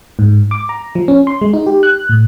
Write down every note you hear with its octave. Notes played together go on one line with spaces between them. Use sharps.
G#2
D6
A#5
F3
C#4
C6
G#3
D#4
G4
F#6
A2